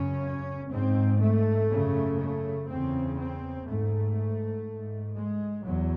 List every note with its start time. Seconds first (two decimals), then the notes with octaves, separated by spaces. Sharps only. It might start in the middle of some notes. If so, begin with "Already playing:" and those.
Already playing: F#2 C#3 C#4
0.71 G#2 C4
1.21 A3
1.71 F#2 C#3
2.21 A3
2.69 E2 C#3 C4
3.20 C4
3.68 G#2 A3
4.67 G#2
5.17 G#3
5.66 E2 F#3